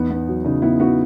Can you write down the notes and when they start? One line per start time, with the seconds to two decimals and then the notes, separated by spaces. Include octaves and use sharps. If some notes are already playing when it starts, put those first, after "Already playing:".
Already playing: E2 B3 D#4
0.10 B3
0.28 F#3
0.45 C#3 D#4
0.62 B3 E4
0.79 B3 D#4 F#4